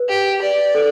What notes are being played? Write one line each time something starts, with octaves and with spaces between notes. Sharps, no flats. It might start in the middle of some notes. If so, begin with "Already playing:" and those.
Already playing: B4
G4
D5
A4